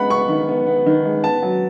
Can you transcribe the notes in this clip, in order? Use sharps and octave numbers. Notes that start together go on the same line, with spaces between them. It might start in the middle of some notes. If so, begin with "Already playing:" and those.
Already playing: G#3 B3 F#5 B5
B3 C#6
D#3
B3
B3
D#3
G#3
B3 A5
F#3